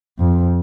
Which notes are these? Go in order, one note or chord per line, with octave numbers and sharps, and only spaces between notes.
F2